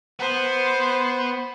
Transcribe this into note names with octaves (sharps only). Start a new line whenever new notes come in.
B3 C5